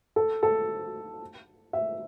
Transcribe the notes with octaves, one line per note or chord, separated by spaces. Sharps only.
A4
A4
E5